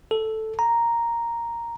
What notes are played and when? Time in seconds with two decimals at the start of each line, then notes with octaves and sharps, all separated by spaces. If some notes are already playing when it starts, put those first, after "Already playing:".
0.11 A4
0.59 A#5